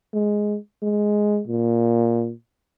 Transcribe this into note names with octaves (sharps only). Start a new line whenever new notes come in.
G#3
G#3
A#2